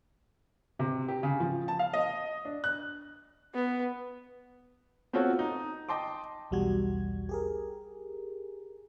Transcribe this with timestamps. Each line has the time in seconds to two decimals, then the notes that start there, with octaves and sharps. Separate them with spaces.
0.79 C3
1.08 G4
1.23 C#3
1.40 F3
1.68 A5
1.79 F5
1.93 D#5
2.45 D4
2.64 F#6
3.54 B3
5.13 B3 C4 F4 F#4 A4 C#5
5.39 D#4
5.89 D#5 G5 A5 C6 D6
6.51 B1 E2 G3 F#4 G#6
7.29 G4 G#4 A#4